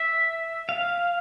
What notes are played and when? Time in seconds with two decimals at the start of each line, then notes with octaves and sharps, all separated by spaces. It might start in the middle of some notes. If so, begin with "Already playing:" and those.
Already playing: E5
0.69 F5